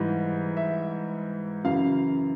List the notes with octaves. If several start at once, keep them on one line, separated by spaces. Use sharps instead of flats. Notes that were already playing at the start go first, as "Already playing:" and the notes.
Already playing: G#2 E3 G3
E5
F#2 C#3 E3 F5